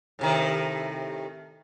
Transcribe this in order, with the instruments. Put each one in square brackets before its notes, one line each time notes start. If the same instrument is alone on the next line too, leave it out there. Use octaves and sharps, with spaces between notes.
[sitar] A2 C3 D#3